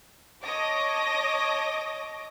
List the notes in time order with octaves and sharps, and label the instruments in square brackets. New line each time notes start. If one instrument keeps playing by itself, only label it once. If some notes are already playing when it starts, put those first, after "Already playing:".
[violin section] C#5 D#5 A5 D6 D#6 A#6